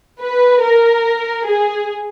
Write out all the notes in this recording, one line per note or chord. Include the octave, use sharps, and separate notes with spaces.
B4
A#4
G#4